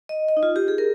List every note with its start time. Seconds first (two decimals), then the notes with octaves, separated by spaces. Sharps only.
0.09 D#5
0.29 D#5
0.37 D#4
0.43 F4
0.56 G4
0.68 G#4
0.78 A#4